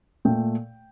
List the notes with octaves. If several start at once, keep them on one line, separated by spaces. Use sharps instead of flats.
A#2 A3 G5